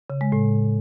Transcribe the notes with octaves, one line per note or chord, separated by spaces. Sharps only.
C#3
G#3
A2